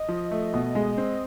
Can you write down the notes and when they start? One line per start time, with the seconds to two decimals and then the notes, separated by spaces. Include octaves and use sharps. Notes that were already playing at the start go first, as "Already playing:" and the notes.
Already playing: D#5
0.09 F3
0.31 A3
0.54 B2
0.75 G#3
0.98 C4